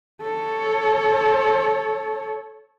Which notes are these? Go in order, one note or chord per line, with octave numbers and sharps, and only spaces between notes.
A4 C#5